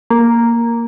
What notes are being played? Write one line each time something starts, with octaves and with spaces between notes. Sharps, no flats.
A#3